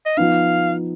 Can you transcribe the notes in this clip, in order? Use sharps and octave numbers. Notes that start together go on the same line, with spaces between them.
D#5
F3 B3 D#4 F5